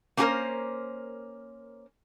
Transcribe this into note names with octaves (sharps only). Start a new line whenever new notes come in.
A#3 C#4 F#4 G#4 A#4 C5